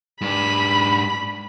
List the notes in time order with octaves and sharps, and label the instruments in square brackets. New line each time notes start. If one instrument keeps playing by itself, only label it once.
[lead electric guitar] G#2 D4 [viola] B5